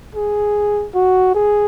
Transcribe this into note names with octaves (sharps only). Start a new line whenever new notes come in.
G#4
F#4
G#4